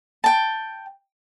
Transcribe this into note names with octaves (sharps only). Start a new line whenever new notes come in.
G5 A5